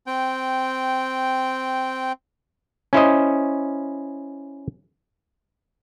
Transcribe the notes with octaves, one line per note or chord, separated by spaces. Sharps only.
C4 G5
C#4 E4 C5 D#5